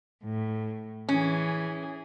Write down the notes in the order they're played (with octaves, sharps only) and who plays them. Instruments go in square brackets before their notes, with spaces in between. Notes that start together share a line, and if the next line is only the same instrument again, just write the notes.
[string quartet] A2
[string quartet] E3 G#4 [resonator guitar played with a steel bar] C#4